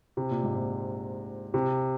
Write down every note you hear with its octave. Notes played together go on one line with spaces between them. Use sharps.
C3
A#2
G#2
A#2
C3